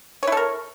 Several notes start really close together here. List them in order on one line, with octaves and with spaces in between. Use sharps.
C#5 E4 A4 A#4